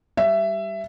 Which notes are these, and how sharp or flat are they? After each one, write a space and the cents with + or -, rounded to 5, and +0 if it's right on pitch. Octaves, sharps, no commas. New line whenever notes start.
G3 +0 E5 +15